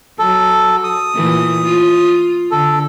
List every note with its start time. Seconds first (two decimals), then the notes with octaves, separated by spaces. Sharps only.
0.19 F#3 A4
0.84 D#6
1.14 A#2 E3 A3
1.64 F4
2.51 D3 A4